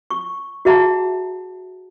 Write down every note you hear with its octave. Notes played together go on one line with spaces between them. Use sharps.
C#6
F#4 G#4 E5 F#5 A5 A#5